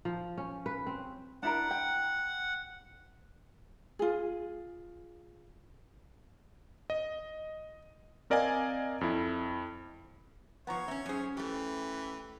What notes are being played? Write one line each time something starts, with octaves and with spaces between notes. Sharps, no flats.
F3
C#4
B4
C4
D4 E4 A#4 F#5
G5
F4 G#4
D#5
C4 A#4 D5 D#5 F5 G#5
F2 E4
F3 B3 C#5 F#5 A#5 C#6
C4 C#4 E5
F#2 C#4 G#4 C5
E3 A3 G4